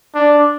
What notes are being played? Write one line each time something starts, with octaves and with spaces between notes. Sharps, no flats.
D4